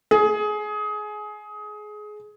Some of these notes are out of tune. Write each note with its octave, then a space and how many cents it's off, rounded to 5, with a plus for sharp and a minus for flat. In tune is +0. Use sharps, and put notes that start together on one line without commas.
G#4 +20